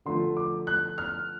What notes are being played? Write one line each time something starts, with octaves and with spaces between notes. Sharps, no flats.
D3 F3 A3 C6
D6
F#6
F6